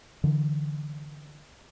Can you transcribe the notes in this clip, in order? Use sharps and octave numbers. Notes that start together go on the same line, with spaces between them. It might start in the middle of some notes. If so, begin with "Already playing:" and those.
D3 E3